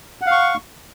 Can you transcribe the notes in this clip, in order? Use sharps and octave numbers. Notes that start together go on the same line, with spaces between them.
F5 F#5 C#6